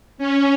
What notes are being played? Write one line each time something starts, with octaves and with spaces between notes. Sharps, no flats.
C#4